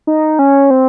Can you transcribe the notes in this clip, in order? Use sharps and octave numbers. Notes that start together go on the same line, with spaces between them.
D#4
C#4
C4